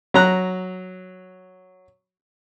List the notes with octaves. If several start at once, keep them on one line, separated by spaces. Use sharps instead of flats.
F#3 A#5 F#6